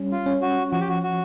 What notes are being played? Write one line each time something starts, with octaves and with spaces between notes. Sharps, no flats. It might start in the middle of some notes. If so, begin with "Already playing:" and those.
Already playing: G3 C#4
F4
C#4
F#4
F3 F#4
G4
F#4
F#4